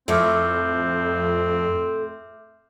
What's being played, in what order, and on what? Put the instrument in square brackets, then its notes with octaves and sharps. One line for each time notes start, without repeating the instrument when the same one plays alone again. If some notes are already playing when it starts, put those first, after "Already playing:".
[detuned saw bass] F2 [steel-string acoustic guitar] A2 A3 [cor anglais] C4 [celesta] E5 D6 F6